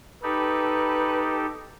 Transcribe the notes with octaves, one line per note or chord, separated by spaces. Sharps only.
D#4 G4 A4 B4